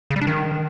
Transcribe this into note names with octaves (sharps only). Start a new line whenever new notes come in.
C#3
G3
D4
D#3